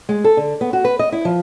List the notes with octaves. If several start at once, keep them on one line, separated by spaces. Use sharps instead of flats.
G#3
A4
D3
B3
F#4
B4
D#5
E4
F3